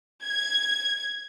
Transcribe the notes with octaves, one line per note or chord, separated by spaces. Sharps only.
G#6